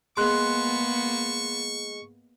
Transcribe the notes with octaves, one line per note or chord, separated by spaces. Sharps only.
G#3 A#3 B3 C6 C#6 F#6